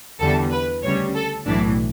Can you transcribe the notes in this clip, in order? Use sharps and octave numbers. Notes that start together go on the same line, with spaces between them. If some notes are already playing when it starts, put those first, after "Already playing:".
E2 D3 G3 A4
B4
D2 C#3 G3 C#5
A4
B1 A2 E3 D4